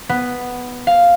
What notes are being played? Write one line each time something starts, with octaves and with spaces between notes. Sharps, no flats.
B3
F5